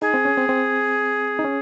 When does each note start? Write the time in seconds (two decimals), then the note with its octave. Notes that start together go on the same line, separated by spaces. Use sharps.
0.01 D#4 G#4
0.14 C4
0.25 C#4
0.37 C4
0.49 C4
1.39 D#4
1.44 C#4